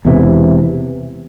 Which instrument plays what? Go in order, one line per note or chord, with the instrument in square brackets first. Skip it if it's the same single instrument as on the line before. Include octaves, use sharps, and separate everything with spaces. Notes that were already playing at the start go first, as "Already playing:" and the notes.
[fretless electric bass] E1 E2 C3 E3